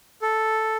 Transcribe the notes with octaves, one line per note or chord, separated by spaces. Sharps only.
A4